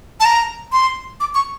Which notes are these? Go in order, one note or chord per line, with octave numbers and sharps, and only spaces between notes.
A5
A#5
C6
D6
C#6